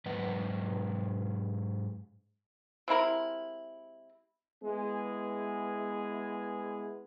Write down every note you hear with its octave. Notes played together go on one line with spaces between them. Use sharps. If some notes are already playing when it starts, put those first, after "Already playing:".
G#2 F#3 B4 D#5 F#5
C3 G#3 E4 A#4
G#3 B3 E4 G#4